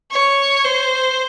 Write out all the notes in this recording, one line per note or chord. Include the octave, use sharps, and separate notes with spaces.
C#5
C5